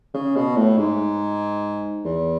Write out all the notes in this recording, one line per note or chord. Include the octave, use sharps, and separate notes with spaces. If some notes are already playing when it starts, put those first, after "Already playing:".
C#3
B2
A2
G#2
E2